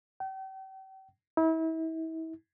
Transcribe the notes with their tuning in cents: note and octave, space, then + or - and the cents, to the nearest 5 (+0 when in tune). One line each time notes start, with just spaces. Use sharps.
G5 -40
E4 -35